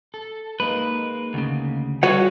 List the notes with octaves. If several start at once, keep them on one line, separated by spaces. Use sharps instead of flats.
A4
G#3 A#3 D#4 B4
D2 C#3
G3 F4 F#4 G#4 A4 B4 C#5 F#5